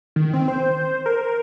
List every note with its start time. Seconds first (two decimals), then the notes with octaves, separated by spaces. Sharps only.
0.16 D#3
0.34 C4
0.48 C5
1.06 A#4